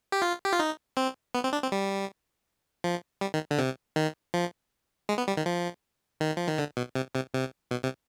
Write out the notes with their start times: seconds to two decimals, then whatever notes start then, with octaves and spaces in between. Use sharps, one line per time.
0.12 G4
0.22 F4
0.45 G4
0.53 F4
0.60 D#4
0.97 C4
1.35 B3
1.44 C4
1.53 D4
1.63 C4
1.72 G3
2.84 F3
3.21 G3
3.34 D#3
3.51 D3
3.58 C3
3.96 D#3
4.34 F3
5.09 G#3
5.18 B3
5.28 G3
5.37 D#3
5.46 F3
6.20 D#3
6.37 F3
6.48 D#3
6.58 D3
6.77 B2
6.95 C3
7.15 C3
7.34 C3
7.71 B2
7.83 C3